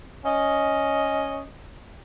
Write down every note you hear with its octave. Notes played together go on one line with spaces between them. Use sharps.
C#4 D#5